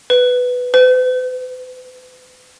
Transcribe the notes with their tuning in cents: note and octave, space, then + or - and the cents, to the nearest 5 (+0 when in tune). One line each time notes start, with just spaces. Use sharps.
B4 +5
B4 +45